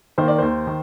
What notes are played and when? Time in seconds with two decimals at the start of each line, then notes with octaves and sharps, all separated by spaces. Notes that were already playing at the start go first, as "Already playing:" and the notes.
0.18 D#3 A#3 C5
0.28 D5
0.38 D#2 C5
0.67 D#3